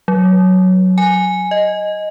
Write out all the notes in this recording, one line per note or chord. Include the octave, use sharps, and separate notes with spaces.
F#3
G#5
D#5